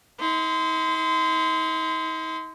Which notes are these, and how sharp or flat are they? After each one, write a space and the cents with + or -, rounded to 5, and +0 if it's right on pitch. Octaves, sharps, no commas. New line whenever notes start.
D#4 +45 C6 -25